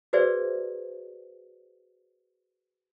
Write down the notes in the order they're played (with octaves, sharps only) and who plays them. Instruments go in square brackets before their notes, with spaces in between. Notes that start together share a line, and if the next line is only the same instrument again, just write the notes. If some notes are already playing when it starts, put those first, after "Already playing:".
[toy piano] F#4 G#4 B4 C5 D5 E5